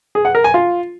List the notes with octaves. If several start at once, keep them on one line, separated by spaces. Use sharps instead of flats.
G#4
F#5
A#4
G#5
F4